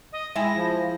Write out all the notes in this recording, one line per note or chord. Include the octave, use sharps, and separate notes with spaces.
D#5
G#3 E4 E5 G5 G#5 A#6
F3